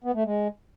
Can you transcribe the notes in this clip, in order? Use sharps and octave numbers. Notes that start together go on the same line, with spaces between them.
B3
A3
G#3